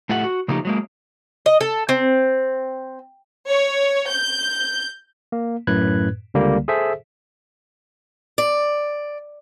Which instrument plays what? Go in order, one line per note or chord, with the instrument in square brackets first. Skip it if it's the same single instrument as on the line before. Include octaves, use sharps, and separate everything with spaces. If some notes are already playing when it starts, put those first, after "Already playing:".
[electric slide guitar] A2 A3 F4 G4 F#5
F#4
C#3 F3 A3 A#3 D#4 G4
F#3 G#3 A#3
[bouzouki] D#5
A4
C4
[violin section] C#5
G6
[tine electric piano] A#3
F#2 A2 B4 F#6 G#6
C#2 D3 G3 A#3
G#4 A4 C5 E5
[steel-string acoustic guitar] D5